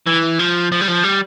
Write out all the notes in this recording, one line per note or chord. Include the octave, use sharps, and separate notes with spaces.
E3
F3
F3
G3
F3
G3